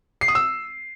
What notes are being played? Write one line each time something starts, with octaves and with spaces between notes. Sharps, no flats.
C7
D#6
E6